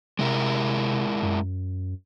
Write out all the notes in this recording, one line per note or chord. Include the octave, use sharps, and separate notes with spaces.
C3 G#3 E4 A#4
F#2